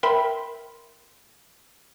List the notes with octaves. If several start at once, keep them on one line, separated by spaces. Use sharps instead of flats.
A#4 E5 G5 B5 C6